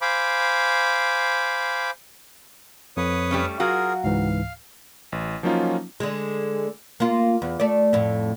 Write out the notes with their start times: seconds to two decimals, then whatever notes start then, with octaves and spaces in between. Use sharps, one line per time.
0.02 C5 F5 G#5 B5 D6
2.97 F2 B4 C#5 D#6
3.31 G3 A3 C#4
3.60 F#3 F4 F#4 G#4 A#4 F5
4.04 C#2 G#2 E3 F5
5.12 A1
5.43 F3 F#3 A#3 C#4 D#4 F4
6.00 D3 G#3
7.00 A#3 F4
7.42 E2
7.60 A3 D5
7.93 F2 A2